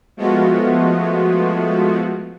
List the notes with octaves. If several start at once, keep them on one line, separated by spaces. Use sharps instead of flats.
F3 G#3 A3 B3 F4 F#4